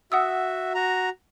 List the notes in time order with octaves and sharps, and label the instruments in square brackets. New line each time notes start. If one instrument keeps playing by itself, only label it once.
[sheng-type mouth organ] F#4 E5 [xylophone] F#5 D#6 E6
[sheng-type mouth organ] F#4 A#5